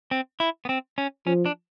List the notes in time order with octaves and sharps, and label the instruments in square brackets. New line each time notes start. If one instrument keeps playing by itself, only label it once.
[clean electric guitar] C4
E4
B3
C4
C#4
[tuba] F3 [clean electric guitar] C#4
[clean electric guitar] D4